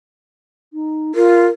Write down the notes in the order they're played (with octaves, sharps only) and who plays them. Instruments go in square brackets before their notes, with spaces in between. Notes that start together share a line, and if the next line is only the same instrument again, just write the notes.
[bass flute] D#4
[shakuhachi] F4 [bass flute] A#4